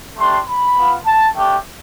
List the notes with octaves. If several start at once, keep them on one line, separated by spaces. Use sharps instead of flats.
A3 D4 G4 C6
B5
B3 F4
A5
A3 D4 G4 G5